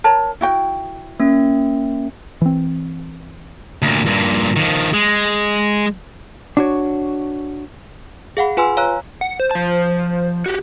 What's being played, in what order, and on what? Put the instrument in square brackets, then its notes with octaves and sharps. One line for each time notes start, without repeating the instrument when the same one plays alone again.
[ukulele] A#4 C#5 A5
E4 F#4 G5
[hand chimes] A#3 C#4
[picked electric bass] E3 C4
[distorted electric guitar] D2 A#2
G2 A#2
D#3 F3
G#3
[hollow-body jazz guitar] D4 F#4 C#5
[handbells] G#4 F5 F#5 B5
F4 B4 G#5 C6 E6
C#5 F5 A#5 E6 F#6
[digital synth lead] F#5
C5
[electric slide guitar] F3 A5
F#4 G4